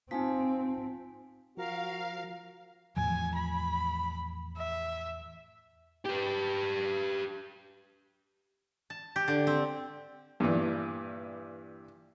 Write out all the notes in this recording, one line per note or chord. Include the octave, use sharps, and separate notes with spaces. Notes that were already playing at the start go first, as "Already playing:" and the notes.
F3 C4 D#4 G#5 B6
F3 F#4 A#4 F5
E2 A2 F3 G#5
B5
E5
G4 B4
A5
G4
D3
C4
G2 A#2 E3